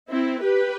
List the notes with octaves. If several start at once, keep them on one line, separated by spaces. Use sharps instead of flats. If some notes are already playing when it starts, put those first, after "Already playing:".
C4 E4
G4 B4